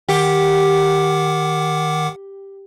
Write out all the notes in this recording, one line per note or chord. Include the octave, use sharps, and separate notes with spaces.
D#3 G4 F#5 D6